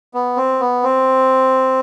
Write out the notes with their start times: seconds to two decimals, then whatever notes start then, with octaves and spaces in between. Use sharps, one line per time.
0.14 B3
0.37 C4
0.60 B3
0.83 C4